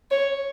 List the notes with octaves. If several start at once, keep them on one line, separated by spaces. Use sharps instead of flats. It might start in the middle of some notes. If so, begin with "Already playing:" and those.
C#5